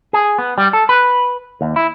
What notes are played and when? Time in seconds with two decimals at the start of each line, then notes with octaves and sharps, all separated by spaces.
0.13 G#4
0.38 B3
0.58 G3
0.73 A4
0.89 B4
1.61 D#2
1.76 E4